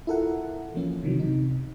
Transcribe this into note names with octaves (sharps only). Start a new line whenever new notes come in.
E4 F4 A4 A#4 F#5
E3 F3 A#3 C#4
C3 D#3 E3 F#3
C3 D#4